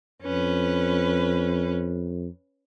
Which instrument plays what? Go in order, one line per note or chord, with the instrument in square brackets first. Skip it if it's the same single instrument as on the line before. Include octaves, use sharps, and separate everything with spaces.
[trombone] F2 [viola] C#4 B4